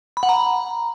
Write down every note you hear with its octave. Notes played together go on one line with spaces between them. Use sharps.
B5
F#5
A#5